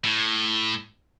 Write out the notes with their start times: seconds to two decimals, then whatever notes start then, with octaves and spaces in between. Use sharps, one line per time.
0.04 A2